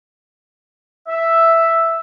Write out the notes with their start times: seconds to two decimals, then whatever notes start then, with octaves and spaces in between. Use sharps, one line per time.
1.08 E5